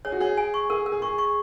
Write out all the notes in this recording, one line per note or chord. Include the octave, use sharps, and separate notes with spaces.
G#4 C#5
F#4
G#4 C#5
G#5
C#6
G#4 A#4
A#4
G#4
G#4 C#6
C#6